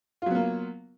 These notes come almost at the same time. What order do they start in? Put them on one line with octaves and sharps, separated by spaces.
F4 F#3 B3 A#3